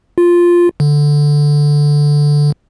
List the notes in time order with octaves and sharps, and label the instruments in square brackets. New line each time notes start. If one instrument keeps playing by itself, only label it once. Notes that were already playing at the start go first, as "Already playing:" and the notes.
[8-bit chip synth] F4
D3